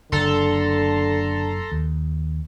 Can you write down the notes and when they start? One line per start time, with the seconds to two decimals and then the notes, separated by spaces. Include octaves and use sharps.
0.12 F#1 D3 A4 A#5 C6
1.72 D#2